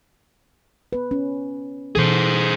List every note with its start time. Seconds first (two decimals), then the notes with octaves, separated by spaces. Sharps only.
0.93 B3 B4
1.11 C#4
1.96 B2 E3 G#4 A4 C5